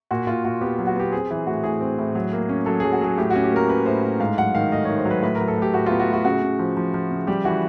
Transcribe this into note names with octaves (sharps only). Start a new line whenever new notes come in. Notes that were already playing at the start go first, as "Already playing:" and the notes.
A#2 F#4
A#2 F4
A#2 F#4
B3 G4
F#3
F#4
B3 G4
C4 G#4
E3
A2 F#4
A2 G#4
C4
A2
F#3
A#3
C#4
F#3 A4
F#3 G#4
F#4
F#3 G#4
A2 G4
C#4 F#4
G4
A#3 A#4
C#4 B4
A2 C5
A2
G#2 F5
F#3 F#5
D#3 F5
A3 D#5
D#3 C#5
C5
F#3
B4
A2 B4
A#4
F#3
A4
A2
G4
A2 F#4
B3 F4
F#4
A2
F#4
C#3 F#4
C#3
F3
F3
F3
C#3
G3 G4
E3 F#4